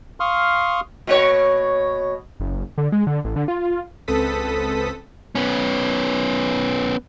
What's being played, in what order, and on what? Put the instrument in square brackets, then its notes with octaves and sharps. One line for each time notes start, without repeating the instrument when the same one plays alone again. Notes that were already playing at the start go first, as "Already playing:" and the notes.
[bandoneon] F5 C6 C#6 D#6 F6
[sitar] B2 A#3 C#5
[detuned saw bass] F#1
D3
G#3
D3
A1
D3
F4
[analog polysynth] C#2 C4 A4 B4 D#6 B6
[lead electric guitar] B3 C#4